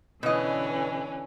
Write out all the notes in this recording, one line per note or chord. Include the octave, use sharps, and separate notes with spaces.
B2 D3 E3 C#4 D#5